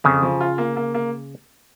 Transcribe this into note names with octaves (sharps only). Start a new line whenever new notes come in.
F2 C#3
F3
F4
A#3
A#3
A#3